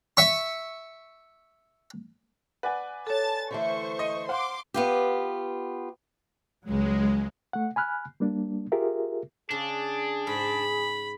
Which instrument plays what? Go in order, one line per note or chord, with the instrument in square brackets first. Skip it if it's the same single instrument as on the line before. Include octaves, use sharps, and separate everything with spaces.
[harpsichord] E5 C#6
[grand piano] B4 D5 G#5 [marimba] F#5
[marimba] A4 C#5 [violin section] A5 A6
[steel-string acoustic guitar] D3 E3 A3 [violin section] C5 C#6
[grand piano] D#5 D#7
[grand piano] C5 F5 F#5 [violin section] C6 D6
[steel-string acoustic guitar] B3 F4 G4
[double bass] C#2 F#3 [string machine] G#3
[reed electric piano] A3 F#5
G#5 B5 F6 F#6
G3 A#3 D4
F4 G4 G#4 A#4 E5
[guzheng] C#3 [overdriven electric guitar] D4 [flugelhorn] G#4
[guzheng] G#2 [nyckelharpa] B5